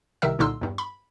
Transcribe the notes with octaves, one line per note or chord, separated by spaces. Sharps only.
C2 C3 D#3 A#4 E5 E6
C2 A#2 D3 D#4 C6 E6
E2 G2
B5